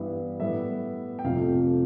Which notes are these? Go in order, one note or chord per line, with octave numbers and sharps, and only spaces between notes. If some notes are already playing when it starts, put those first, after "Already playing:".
Already playing: G2 E3 G3 B3 E5
A2 G3 B3 E5
G5
F2 C3 F3 A3 F5